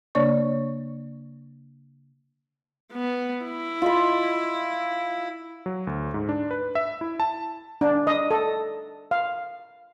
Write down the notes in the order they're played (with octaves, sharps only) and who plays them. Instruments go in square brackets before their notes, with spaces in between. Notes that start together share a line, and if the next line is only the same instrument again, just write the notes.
[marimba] C#3 A#3 D4 C#5 D5 C#6
[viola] B3
E4
[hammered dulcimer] F4 D#5 B5
[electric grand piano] F#3
D2
G#2
D4
B4
E5
E4
A5
[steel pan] D4
D#5
A4
F5